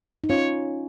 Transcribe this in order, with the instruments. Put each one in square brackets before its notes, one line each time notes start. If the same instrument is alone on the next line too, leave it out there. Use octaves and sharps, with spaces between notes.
[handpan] D#4
[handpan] C#4 F4 [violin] C#5